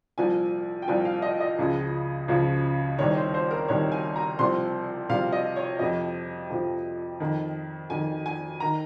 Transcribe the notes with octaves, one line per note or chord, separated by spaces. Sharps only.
C2 A#2 F3 G#5
G5
C2 A#2 F3 G#5
F5
D#5
D#5
C#2 C#3 F3
C#2 C#3 F3
C2 C3 D#3 C#5
C5
C5
A#4
C2 C3 D#3 C#5
G#5
A#5
C2 C3 F3 C6
C2 C3 F3 F5
D#5
C#5
F2 C3 F3 D#5
F2 C3 F3
F2 D#3
F2 D#3 G#5
G#5
D#3 A#5